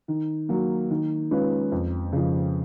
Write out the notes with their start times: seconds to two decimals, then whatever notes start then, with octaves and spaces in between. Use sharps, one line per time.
0.08 D#3
0.49 F#3 A#3
0.90 D#3
1.31 G#3 C#4 F4 B4
1.72 F2
2.13 C#3 F3